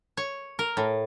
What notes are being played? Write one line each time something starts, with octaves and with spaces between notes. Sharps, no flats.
C#5
A#4
A2